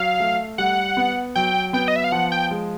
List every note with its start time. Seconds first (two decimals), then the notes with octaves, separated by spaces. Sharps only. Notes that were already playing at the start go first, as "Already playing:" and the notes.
Already playing: F#3 F5
0.20 A3
0.58 G3 F#5
0.97 B3
1.35 F#3 G5
1.73 B3 G5
1.88 D#5
1.96 E5
2.04 F5
2.12 F3 F#5
2.32 G5
2.51 G#3